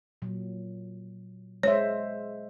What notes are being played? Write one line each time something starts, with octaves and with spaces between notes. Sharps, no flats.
A#2 F#3
G#3 C5 C#5 E5